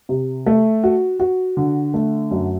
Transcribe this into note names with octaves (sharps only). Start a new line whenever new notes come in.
C3
A3
F#4
F#4
D3
A3
F#2